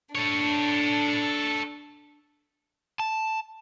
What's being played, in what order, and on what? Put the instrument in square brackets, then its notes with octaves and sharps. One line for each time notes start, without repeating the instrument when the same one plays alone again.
[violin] D4 [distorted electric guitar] A4 C#5
[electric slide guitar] A5